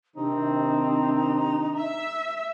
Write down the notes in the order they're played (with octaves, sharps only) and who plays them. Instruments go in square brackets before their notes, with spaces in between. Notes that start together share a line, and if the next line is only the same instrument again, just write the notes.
[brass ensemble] C3 D#3 C4 [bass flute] D4 [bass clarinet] D#4
[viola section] E5